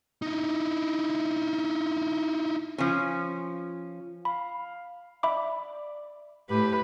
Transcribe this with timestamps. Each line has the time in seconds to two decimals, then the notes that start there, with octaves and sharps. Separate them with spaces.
0.22 D#4 E4
2.78 F3 C#4
4.25 F5 B5
5.23 D5 E5 B5 D6
6.50 A2 G4 B4